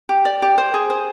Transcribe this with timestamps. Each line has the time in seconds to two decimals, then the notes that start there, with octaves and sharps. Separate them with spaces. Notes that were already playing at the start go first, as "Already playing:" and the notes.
0.09 G4
0.25 D5
0.42 G4
0.58 C5
0.74 G#4
0.90 C5